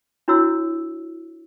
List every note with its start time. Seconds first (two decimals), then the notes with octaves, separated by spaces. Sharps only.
0.28 D4 E4 F#4 C#5 E6